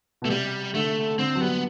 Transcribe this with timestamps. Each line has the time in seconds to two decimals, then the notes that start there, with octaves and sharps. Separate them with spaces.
0.22 B2 A3
0.30 C3 G3
0.75 D3 A3
1.19 D3 C4
1.35 F#3
1.41 G3 B3